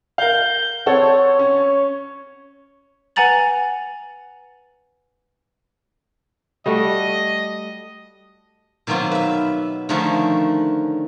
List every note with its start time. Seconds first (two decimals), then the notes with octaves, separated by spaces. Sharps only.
0.18 A#4 F5 G6
0.86 C4 A4 C#5 F#5
1.39 C#4
3.16 B4 F#5 G#5 A#5 A6 F#7
6.66 G3 A3 F#4 D#5
8.87 B2 D#3 F#3 A#3 C4 F4
9.11 B4 E5
9.89 D3 D#3 F3 A3 C#4 D#4